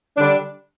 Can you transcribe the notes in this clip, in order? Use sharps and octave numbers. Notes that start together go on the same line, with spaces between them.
D3 G3 D4